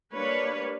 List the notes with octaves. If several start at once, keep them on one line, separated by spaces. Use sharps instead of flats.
G3 A#3 D4 B4 C#5